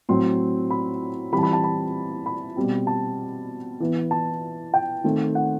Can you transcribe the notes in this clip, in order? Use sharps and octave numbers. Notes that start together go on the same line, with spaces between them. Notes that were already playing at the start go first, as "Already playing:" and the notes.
A2 F#3 C4 C6
B5
E3 G3 C4 B5
A5
B5
A5
B5
B5
B2 G3 C4
A5
E3 B3
A5
G5
D#3 A3 C4
F#5